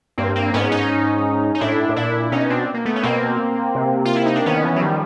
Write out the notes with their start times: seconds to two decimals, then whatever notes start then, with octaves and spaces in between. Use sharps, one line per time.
0.18 G2 A#3 C4
0.36 A#3 C4
0.54 G#2 B3 C#4
0.72 C#4 D#4
1.55 D#4
1.61 A2 D4 E4
1.89 A2
1.96 A#2 D4 E4
2.32 B2 C#4 D#4
2.50 C4 D4
2.74 A#3
2.85 A3 B3
2.96 C#4
3.03 B2 A#3 C4
3.75 C3
4.05 F4
4.16 E4
4.26 D#4
4.36 D4
4.46 D#3 B3 C#4
4.64 E3
4.76 F#3
4.82 D#3 F3 G3